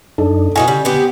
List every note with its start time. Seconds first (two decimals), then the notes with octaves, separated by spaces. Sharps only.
0.18 F#2 D4 D#4 A4
0.56 B2 D#4 E4 F#4 G#5
0.68 C#3 G3
0.85 B3 C4 G4